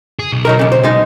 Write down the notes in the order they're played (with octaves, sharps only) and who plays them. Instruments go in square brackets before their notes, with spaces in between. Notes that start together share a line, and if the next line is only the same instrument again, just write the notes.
[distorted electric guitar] G#4
B1
[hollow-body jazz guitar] F#3 D#4 A#4
D#2 C#3
C5
B2 G#3 D#4